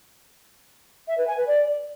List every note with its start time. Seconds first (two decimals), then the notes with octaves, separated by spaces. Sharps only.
1.07 E5
1.17 B4
1.27 G#5
1.37 B4
1.47 D5